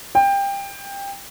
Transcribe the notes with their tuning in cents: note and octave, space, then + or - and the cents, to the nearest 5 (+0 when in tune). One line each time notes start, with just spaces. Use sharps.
G5 +20